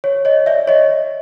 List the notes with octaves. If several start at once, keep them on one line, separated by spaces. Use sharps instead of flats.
C#5
C#5 D#5
D5 E5
C#5 D#5